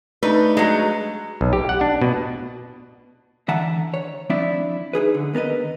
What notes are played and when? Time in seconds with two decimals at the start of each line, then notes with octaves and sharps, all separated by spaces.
0.23 A3 D4 D#4 B4
0.57 F#3 G#3
1.41 B1
1.53 G4
1.69 F#5
1.81 D4
2.02 B2
3.48 D3 E3 E5 F#5 A5 A#5
3.94 C#5
4.30 F3 C4 D4 E4 D5 E5
4.93 D#4 F4 G#4 B4
5.14 D3
5.33 D#2 B3 A#4 B4 D#5